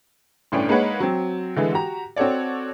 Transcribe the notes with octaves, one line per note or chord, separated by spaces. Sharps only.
G1 A2 C#4 D4 G5
G#3 A#3 D#4 B4 C#5 F#5
F#3 C4
D3 E3 G#3
F#4 G4 A#5
C4 F#4 A4 C#5 D5